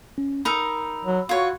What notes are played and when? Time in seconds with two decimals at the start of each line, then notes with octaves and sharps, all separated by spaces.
0.18 C#4
0.45 D#4 A#4 B5 E6
1.05 F#3
1.29 F4 F#4 C#5